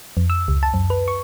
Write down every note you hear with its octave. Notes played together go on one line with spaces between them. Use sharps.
F2
E6
C#2
A5
F#2
B4
C#6